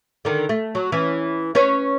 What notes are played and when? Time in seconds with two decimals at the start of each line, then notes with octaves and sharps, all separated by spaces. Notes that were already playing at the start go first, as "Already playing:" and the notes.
0.25 D3 D#3
0.49 A3
0.75 F#3
0.92 E3 C#4
1.55 C#4 B4 C#5